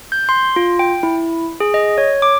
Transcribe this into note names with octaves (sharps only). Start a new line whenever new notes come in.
G6
C6
F4
G5
E4
G#4
D#5
C#5
D6